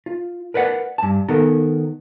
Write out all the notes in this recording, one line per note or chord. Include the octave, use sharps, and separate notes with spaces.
F4
A#4 B4 D5 F#5
G2 A5
D#3 B3 A4 A#4